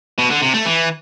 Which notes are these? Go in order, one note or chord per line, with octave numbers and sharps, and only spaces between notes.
B2
D3
C3
A3
E3